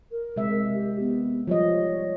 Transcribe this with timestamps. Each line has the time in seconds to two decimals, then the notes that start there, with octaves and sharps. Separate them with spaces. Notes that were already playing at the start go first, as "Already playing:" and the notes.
0.11 A#4
0.36 C3 G#3 E5
0.74 G4
0.99 B3
1.47 F3 G3 C#5 D#5